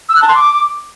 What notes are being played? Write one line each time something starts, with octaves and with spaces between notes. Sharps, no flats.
E6
F#6
A5
C6
D6